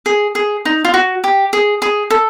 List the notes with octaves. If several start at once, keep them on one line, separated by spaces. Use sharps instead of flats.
G#4
G#4
D#4
F4
F#4
G4
G#4
G#4
A4